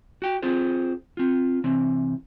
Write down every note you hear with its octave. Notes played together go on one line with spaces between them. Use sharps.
F#4 G5
C4 F4 G#4 C5
C4 F4
C3 E3 C4